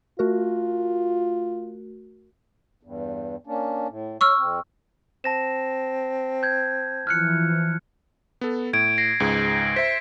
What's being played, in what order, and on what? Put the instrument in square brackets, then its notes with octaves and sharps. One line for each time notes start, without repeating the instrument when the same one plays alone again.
[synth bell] A3 F#4 A#4 [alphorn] F4
[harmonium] E2 G2
A#3 C#4 D4
A2
[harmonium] C#5 [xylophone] C#6 E6 F6
[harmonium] F2 C4
[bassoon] C4 [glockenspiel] A5 A#6 E7
[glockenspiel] G6 G#6
[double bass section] E3 F3 [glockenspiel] F6 F#6 C#7
[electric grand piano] B3 A4
[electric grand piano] A2 [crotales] G#6 D7
[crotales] A#6 C7
[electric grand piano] C#2 G#2 G#4
[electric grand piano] C5 E5 [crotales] B6